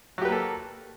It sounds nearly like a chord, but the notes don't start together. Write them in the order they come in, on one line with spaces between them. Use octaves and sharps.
F#3 G4 B4 A#3 A4